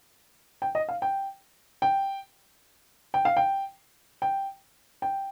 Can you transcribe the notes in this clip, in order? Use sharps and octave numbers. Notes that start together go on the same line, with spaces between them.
G5
D#5
F5
G5
G5
G5
F5
G5
G5
G5